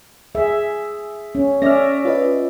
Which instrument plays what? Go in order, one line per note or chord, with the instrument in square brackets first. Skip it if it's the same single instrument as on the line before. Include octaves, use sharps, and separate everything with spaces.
[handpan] G#4 E5
C#4
[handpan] C#4 D5 E5 [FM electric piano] F6 A#6
[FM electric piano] F4 B4 D#5